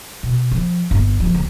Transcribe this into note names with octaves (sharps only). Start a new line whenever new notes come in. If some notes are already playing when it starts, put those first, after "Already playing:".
B2
F3
G1
F3
D2